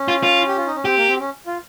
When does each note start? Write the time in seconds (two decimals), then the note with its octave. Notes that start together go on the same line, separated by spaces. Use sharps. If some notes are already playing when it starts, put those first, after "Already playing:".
Already playing: C#4
0.08 F4
0.23 F4
0.47 G4
0.57 F4
0.66 D#4
0.75 C#4
0.85 C4 G4
0.97 A#3
1.08 C4
1.20 C#4
1.46 F4